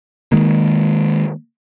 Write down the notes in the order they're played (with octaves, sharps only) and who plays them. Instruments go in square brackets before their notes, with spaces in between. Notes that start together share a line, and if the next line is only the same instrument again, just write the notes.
[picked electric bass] D#3 G#3 A#3